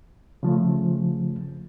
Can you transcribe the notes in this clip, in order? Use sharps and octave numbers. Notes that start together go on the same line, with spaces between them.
C#3 F3 A3